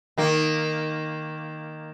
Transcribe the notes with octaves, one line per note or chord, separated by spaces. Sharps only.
D#3 A#3